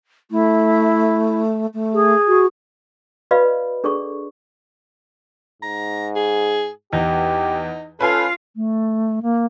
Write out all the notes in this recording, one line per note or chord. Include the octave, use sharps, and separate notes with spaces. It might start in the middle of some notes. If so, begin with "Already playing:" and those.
A3 E4
A3
G#4
F#4
F#4 B4 D5 D#5 F5 B5
D4 G#4 A4 D5 C#6
G#2 A#5
G#4
E2 D#4 G4
C#4 F4 A4 B4 F5 G#5
A3
A#3